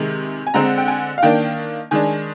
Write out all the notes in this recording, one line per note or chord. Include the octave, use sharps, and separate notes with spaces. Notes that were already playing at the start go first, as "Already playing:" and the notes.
Already playing: C3 D#3 G#3
G#5
D3 G#3 C4 A#5
G5
G#5
F5
D#3 A#3 D4 G5
D#3 G#3 D4 G#5